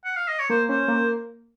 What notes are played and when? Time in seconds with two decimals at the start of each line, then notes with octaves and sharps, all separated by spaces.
0.05 F#5
0.16 F5
0.28 D#5
0.39 C#5
0.50 A#3 C5
0.69 C#4 C5
0.88 A#3